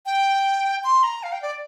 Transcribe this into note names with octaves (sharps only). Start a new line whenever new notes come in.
G5
C6
A#5
F5
G5
D5